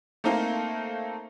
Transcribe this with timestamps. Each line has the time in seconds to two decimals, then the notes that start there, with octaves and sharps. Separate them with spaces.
0.24 A3 A#3 C4 D#4 F5